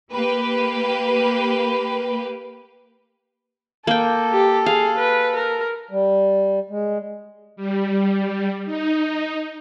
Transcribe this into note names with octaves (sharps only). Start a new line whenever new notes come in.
A#3 G4 B4
A#3 A4 G5
G4
G#4 F5
B4
A#4
G3
G#3
G3
D#4